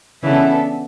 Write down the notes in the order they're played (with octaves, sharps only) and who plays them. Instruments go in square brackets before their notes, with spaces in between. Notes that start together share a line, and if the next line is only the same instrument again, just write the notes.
[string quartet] C#3 E3 [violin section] B3 D4 A4 E5